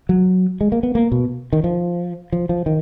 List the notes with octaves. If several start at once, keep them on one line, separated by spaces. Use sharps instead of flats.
F#3
G#3
A#3
B3
A#3
B2
D#3
F3
F3
F3
D#3